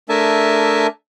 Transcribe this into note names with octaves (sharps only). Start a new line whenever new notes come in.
A3 D4 A#4 E5 G#5 A5